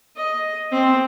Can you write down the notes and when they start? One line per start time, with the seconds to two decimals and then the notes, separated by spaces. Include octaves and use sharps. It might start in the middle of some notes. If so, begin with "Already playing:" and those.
0.16 D#5
0.71 C4